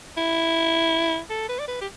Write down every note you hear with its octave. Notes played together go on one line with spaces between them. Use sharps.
E4
A4
B4
D5
B4
G4